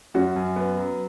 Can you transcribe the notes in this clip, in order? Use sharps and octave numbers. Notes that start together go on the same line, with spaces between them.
F#2 C#4 F#4
F#2
B3
F#3